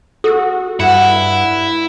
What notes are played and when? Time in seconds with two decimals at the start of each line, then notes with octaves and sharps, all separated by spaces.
0.24 F#4 A4 E6
0.80 G2 E4 F#5